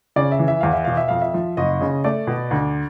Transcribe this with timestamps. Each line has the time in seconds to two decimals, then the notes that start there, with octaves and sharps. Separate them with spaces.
0.16 C#3 D5
0.32 E5
0.39 E3
0.48 E5
0.61 E2 F5
0.73 E5
0.85 B2 F5
0.97 E5
1.08 F2 F5
1.22 E5
1.34 F3
1.57 F#1 D#5
1.81 C#3
2.04 A3 D5
2.27 B2
2.51 D2